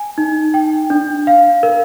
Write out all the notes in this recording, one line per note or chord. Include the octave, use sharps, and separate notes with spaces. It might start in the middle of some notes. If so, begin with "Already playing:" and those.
Already playing: G#5
D#4
G5
D4
F5
A#4